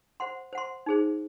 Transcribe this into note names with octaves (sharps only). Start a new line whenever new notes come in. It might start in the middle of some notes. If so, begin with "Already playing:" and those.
C5 F#5 C6
C5 F#5 C6
D#4 G#4 C5